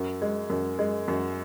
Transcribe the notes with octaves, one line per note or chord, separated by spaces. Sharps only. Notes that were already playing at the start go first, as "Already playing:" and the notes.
Already playing: F#2
G#3
F#2
G#3
F#2